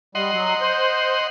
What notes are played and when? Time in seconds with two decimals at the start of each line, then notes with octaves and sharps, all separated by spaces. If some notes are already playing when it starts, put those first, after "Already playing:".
0.15 G3 D#5 F#5 C6
0.32 F#3
0.61 C5